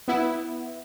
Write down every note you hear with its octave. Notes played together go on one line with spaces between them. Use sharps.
B3 E4